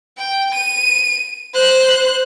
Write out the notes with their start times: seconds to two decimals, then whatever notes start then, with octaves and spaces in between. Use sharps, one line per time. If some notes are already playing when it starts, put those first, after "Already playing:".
0.18 G5
0.55 D#7
1.54 C5 F#6